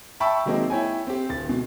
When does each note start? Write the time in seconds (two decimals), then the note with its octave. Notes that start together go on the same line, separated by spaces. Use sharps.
0.20 E5 G5 A5 B5 C#6 E6
0.46 D#3 F#3 G#3 A#3 C4 D#4
0.70 E4 C#5 G5 G#5
1.07 C4 G4
1.29 D1 A6
1.49 B2